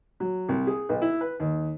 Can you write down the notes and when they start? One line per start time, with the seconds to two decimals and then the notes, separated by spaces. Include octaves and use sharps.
0.20 F#3
0.49 C2
0.67 G#4
0.89 B1
1.02 E4
1.21 B4
1.40 D#2